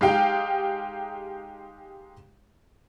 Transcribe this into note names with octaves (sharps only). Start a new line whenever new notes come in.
G#3 D#4 G4 F5 G5